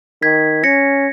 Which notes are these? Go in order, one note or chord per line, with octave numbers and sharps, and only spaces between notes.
D#3 G#6 B6
C#4 A#6 C#7